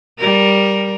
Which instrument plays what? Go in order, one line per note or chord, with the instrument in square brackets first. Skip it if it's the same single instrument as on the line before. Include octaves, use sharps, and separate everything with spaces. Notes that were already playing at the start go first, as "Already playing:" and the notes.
[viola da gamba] G3 A#4